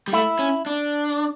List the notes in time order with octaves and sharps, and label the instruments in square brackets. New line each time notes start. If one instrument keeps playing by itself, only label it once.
[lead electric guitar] G3
[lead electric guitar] A3 [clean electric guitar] E4
[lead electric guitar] C#4
D4